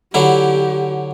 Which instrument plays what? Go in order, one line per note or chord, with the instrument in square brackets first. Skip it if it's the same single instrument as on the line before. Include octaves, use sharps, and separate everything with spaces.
[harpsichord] D3 F#3 E4 [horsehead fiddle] G4